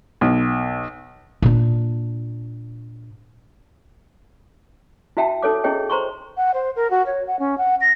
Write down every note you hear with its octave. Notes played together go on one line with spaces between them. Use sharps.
B1
A#2 D4
E4 F#4 E5 G5 A5
D#4 A4 C#5 D6
C#4 E4 G#4 C#5 D#5 G5
C5 A#5 C6 C#6
F#5
C5
A#4
F#4
C#5
F#5
C#4
F#5
A#6